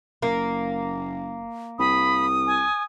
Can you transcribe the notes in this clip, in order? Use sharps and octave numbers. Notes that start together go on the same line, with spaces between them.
F#1 A#3
C2 B5 D#6
G#5